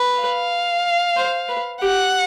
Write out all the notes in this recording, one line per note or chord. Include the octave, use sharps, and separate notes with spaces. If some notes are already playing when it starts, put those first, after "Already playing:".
Already playing: B4
F5
C5
B4
G4 F#5